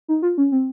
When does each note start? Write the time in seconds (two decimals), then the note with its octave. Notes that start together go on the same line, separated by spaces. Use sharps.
0.08 D#4
0.22 F4
0.38 C#4
0.52 C4